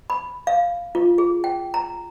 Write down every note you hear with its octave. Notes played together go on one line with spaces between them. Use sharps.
B5
F5
F4
G#4
G5
A#5